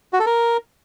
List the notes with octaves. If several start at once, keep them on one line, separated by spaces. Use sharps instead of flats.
F#4
A4
A#4